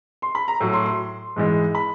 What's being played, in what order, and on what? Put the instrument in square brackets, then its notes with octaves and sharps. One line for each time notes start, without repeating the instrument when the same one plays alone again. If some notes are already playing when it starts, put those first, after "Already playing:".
[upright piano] C6
B5
A#5
A2 F#3
C6
C6
G#2 E3 G#3
B5